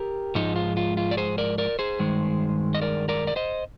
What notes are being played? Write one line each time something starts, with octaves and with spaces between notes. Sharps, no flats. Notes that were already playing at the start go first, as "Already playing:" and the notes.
Already playing: G4 A#4
G#2 F3 G#3 D#4
F4
F4
F4
D5
G#4 C5
A#4 D5
A#4 D5
G#4 C5
G2 D#3 G#3
D#5
A#4 D5
A#4 D5
D5
C5 D#5